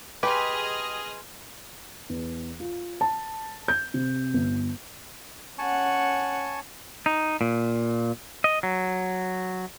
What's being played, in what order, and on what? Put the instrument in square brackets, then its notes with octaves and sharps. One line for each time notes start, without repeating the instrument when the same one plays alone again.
[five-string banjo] G4 [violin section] G#4 D#5 F6 [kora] B4 [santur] G#5 C6
[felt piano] E2
F4
A5
G6
C3
G1
[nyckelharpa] C#4 F#5 [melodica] G#5 A5 C#6
[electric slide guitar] D#4
A#2
D#5
F#3